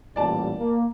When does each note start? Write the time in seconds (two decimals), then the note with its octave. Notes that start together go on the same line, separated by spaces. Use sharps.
0.16 A1 A#2 G3 D5 A5
0.57 A#3